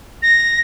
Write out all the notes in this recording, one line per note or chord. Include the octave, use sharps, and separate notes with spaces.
A#6